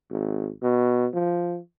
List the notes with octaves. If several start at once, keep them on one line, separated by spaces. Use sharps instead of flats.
G#1
B2
F3